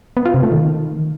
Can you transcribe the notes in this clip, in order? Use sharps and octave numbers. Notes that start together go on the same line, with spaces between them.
B3
F4
C3
A3
D#3